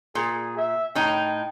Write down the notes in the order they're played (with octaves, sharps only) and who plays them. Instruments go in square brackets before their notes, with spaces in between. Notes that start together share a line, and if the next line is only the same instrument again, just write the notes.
[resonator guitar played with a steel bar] A#2 [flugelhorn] G#4
[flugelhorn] E5
[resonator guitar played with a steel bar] A2 D#4 [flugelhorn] G5